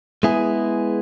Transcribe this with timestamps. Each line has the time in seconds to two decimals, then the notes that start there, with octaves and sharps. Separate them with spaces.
0.23 G#3 B3 E4 G#4